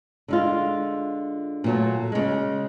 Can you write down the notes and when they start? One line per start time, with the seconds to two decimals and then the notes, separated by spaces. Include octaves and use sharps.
0.28 D3 G#3 F4
1.64 A#2 F#3 A3
2.12 C#3 G#3